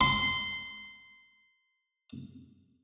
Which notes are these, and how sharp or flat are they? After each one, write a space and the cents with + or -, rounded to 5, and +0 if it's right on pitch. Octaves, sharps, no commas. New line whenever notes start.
C6 -15